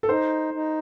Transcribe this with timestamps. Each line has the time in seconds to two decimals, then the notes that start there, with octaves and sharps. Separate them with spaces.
0.03 A4
0.09 D#4 C5
0.54 D#4